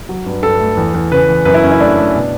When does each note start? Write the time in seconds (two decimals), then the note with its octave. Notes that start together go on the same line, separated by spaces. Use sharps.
0.09 F#3
0.26 G2
0.43 G2 A4
0.60 A3
0.77 E2
0.94 E2
1.12 C#3 B4
1.29 E2
1.45 F#2 B4
1.54 E4
1.63 F#2 C#4
1.71 E4
1.80 A3 D4
1.97 A3
2.14 B2